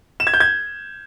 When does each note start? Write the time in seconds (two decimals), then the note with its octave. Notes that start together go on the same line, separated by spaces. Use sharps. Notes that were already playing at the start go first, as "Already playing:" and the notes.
0.20 E7
0.27 G#6
0.34 G6
0.40 G#6